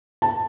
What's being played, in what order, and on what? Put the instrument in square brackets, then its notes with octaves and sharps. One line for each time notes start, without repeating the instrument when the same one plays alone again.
[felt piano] A5